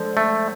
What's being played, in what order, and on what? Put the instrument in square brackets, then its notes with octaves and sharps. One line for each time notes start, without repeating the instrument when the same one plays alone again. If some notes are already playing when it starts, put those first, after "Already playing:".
Already playing: [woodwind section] D3 F3 G#3
[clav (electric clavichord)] A3